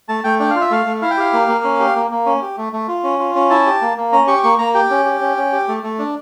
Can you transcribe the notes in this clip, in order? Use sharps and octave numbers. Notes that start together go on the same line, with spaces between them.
A3 A5
A3 G5
D4 G5
F4 F5
E5
A3 F5
A3
E4 F5
G5
G4 F5
A#3
A#3
C#4
G4
A#3
A#3
C#4
G4
A3
A3
F4
C#4
F4
C#4
E4 A5
G4
A#3
A#3
C#4 A#5
G4 C#6
A#3 C#6
A#3 A#5
G4 G5
C#4
G4
C#4
C#4
G4
A3
A3
D4